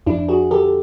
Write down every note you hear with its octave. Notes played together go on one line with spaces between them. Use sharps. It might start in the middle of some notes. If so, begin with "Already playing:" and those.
F2 D4 E4
F#4 G#4
D3 G4 A4